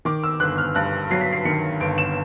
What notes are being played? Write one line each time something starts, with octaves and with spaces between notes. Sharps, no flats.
D#3 D6
E6
G1 F#6
F6
G2 F#6
F#3 C7
B6
C7
D#3 C#7
G1 D7
E7